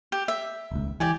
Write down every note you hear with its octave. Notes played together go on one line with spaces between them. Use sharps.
G4
E5
D#1 C#2
E3 G4 D5 G#5